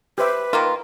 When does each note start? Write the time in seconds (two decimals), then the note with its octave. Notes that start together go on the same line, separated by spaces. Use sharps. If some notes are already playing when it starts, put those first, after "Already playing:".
0.18 G4 B4 C5 E5
0.53 D#3 A#3 F4 A#4 B5